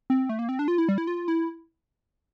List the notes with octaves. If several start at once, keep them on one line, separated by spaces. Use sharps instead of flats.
C4
A3
A#3
C4
D4
F4
E4
G3
E4
F4
E4